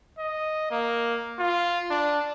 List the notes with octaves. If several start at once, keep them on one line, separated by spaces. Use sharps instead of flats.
D#5
A#3
F4
D4